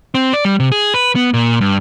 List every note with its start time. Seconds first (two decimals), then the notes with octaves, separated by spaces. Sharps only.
0.14 C4
0.33 D5
0.45 G3
0.60 C3
0.72 G#4
0.94 B4
1.15 B3
1.34 A#2
1.61 G2